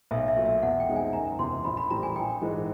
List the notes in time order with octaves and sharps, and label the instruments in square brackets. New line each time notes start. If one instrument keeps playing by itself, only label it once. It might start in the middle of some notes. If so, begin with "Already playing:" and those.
[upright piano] B1 [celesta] E5
[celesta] E5
[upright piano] A#2 F#3 A3
[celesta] E5
[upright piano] E2 [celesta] F#5
[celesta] G5
[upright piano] B2 G#3 C4 D#4
[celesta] G#5
[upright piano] F#1 [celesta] A#5
[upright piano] E2 C3 E3 [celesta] C6
[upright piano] A#1 [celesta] B5
[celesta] B5
[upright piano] A2 E3 G3 C4 [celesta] A#5
[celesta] G#5
[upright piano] A#1 [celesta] G5
[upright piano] G#2 E3 G#3